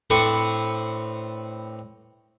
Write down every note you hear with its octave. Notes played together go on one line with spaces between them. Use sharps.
A2 C4 D4 B4 C5 C#6